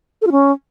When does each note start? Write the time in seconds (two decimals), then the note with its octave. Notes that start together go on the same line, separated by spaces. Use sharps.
0.22 A4
0.27 F4
0.32 C#4